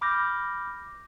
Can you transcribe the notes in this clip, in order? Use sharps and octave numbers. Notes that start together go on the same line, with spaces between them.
B5 D6 F6 G6 A#6